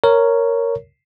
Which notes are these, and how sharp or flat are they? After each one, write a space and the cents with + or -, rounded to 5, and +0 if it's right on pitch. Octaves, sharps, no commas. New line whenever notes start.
A#4 -5 C#5 +5